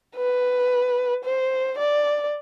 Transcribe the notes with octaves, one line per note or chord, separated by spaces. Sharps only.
B4
C5
D5